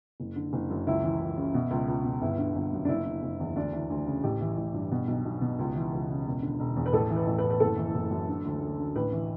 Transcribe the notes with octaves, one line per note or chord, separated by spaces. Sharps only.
F#1
D3
F#1
F#2
C#2 E4
E3
C#2
C#3
B2
C#2
C#2
B2
G1 E4
D3
G1
F#2
D4
F#1 E4
D3
F#1
E2
D2 D4
E3
D2
C#3
A1 G4
E3
A1
G2
B2
B1
B1
B2
C#2
E3
C#2
C#3
E1
D3
E1
E2
B4
A1 A4
E3
B4
A1
B4
A2
B4
F#1 A4
E3
F#1
F#2
D3
D2
D2
D3
A1 B4
E3